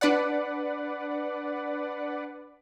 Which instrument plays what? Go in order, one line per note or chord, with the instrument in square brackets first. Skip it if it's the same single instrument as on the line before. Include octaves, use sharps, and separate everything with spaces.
[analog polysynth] D4 B4 D5 F#5